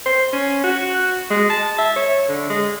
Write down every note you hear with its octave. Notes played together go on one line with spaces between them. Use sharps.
C5
C#4
F#4
G#3
A5
E5
C#5
D3
G#3